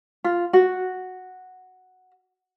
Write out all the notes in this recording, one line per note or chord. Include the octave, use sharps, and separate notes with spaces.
F4
F#4